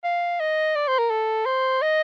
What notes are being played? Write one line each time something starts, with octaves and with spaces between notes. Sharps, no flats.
F5
D#5
D5
C5
A#4
A4
C5
D#5